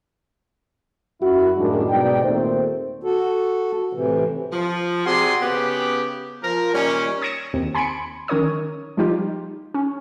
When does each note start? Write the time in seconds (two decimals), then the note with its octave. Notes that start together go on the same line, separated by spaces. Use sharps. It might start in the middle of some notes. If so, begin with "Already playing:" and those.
1.22 F#2 E4 F#4
1.57 F#2 A2 D#3 G3 G#3 D4
1.90 G#2 B2 D#4 D5 G5
2.23 D#2 A#2 A3 C4 A4 C5
3.04 F#4 A4
3.93 A2 C3 E3
4.52 F3
5.06 C3 C4 F#4 G#4 D5 C6
5.42 C#3 B3 G4
6.43 F3 A#4
6.73 A#2 D#3 G3 C#4
7.22 D#6 G#6 A#6 C#7 D#7 E7
7.53 D#2 C4
7.75 G#5 B5 C6 G#6 C#7 D7
8.28 D#3 C#4 A#4 C#5 D#6
8.97 F3 G3 D#4 F4 G4
9.74 C#4